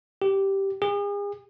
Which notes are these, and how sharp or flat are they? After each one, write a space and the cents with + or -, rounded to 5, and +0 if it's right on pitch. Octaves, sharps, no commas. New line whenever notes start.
G4 -5
G#4 -40